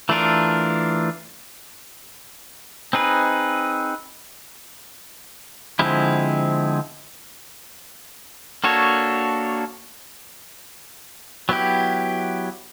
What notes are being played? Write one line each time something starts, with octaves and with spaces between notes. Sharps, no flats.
E3 A3 D4 F4 A#4
C4 D#4 G#4 B4
D3 F3 G#3 C4 E4
A#3 D4 F#4 A4 C#5
F#3 B3 E4 G4